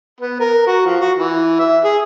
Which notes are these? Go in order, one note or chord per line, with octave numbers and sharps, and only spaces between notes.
B3
A#4
F#4
F3
F#4
E3
E5
G#4